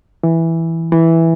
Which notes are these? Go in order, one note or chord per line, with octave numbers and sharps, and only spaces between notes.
E3
E3